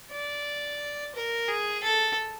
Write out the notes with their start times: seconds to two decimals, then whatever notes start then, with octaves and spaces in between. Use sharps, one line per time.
0.11 D5
1.16 A#4
1.49 G#4
1.83 A4